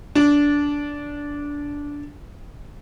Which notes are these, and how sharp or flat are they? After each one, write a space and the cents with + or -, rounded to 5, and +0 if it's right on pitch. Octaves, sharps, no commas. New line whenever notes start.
D4 -15